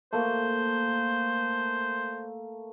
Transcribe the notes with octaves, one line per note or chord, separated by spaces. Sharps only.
A3 A#3 C5